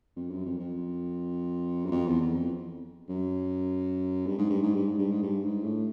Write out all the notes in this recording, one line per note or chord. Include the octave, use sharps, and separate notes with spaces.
F2
F#2
F2
F2
F#2
F2
E2
E2
F2
F#2
G2
G#2
G2
G#2
G2
G#2
G2
G#2
G2
G#2
A2